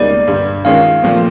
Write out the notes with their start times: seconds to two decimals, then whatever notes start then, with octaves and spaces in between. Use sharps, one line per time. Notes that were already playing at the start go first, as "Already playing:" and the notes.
Already playing: C#2 B2 G3 A#3 D#4 D5
0.27 G2 D3 G3
0.65 D#3 G#3 C#4 F4 F5
1.03 A#2 F3 A3 C4